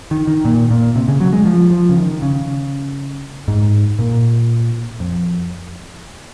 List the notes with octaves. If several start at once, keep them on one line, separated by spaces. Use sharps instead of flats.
D#3
D#3
A#2
A#2
C3
C#3
F#3
G#3
F3
F3
C#3
D#3
C#3
G#2
A#2
F2